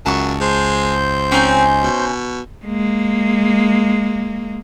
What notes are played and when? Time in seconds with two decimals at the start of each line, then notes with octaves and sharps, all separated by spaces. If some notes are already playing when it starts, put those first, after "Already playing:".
0.06 C#2 F#2 A5 C#6
0.41 G#3 C5 G6
1.32 C4 C#4 D#4 G#5
1.84 B2
2.65 G#3 A#3